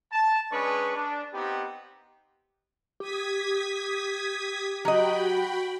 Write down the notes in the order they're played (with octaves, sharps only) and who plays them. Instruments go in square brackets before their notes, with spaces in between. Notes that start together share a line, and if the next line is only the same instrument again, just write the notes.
[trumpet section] A5
G#3 C#4 D4 G#4 B4 C#6
D4
B3 C4 D#4 G4
[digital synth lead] G4 [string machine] D#6 G#6 B6
[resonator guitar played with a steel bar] F#3 D#5 [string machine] F#4 G5 B5